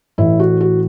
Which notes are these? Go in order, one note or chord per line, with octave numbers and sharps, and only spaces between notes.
A1 A2 E3 E4
F#4
F#4